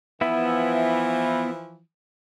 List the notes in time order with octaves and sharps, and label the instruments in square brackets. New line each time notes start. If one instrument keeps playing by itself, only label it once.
[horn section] E3 F3 [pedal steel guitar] B3 E4 E5